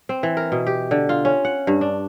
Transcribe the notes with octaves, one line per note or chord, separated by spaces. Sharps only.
C4
E3
A#4
B2
G4
D3
F4
C#4
F#5
G2
D4